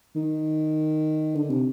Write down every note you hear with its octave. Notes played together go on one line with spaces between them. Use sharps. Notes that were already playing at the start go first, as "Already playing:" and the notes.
D#3
D3
C3